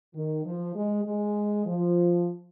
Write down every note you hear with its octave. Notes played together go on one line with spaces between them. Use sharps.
D#3
F3
G#3
G#3
F3